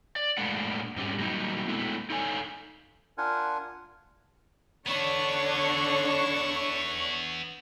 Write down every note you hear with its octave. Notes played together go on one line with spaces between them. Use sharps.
D5
A2 G#3 A#3 D4 F#5
G#2 G3 C#4
F#3 G3 A#3 D#4
G#3 A3 B3 E4
D#4 A4 C#5 G#5
D4 F4 A#4 F#5 G#5
D3 B3 D4 E4 C#5 C#6